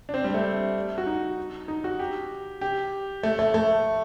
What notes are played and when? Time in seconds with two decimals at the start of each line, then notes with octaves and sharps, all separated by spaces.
0.09 D4
0.14 C4
0.24 G3
0.34 A3
0.98 F#4
1.06 D#4
1.68 D#4
1.84 F#4
1.99 G4
2.61 G4
3.23 A3
3.39 A3
3.54 A3